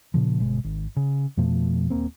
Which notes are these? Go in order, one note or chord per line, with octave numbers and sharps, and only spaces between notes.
A#2 C#3 F3
G1 B2 G#3
G#1
C#3
F2 B2 F3 A3
D#1 G#1 A#3 C4